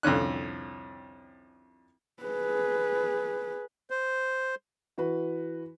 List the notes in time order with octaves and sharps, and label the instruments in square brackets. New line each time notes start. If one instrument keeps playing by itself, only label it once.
[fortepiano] C2 F2 D3 C#4 F#6
[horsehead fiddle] G#4 B4
[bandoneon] C5
[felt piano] E3 F#4 B4